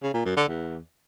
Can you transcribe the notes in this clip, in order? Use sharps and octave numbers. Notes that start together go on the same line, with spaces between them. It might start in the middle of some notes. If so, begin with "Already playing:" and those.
C#3
A#2
F#2
D3
E2